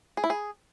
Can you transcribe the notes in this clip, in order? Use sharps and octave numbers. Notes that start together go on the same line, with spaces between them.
G#4
E4
G#4